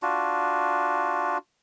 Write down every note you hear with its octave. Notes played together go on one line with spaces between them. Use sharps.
D4 F4 F#4